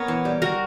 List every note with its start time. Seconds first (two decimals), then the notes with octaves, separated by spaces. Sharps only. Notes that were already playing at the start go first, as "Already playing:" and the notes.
Already playing: B3 A#4 C#5
0.08 E3
0.25 G3
0.42 F#4 A#4